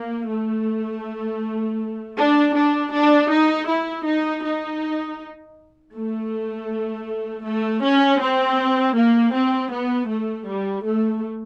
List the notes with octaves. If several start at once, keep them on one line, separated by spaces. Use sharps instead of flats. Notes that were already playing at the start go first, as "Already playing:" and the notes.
Already playing: A#3
A3
D4
D4
D4
D#4
E4
D#4
D#4
A3
A3
C#4
C4
A#3
C4
B3
A3
G3
A3